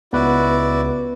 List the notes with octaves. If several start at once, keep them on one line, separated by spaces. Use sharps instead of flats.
C#2 B3 E4 F#4 B4 D5